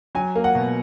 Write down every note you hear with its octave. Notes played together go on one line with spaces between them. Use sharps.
F#3 G#5
A#3
F#5
B2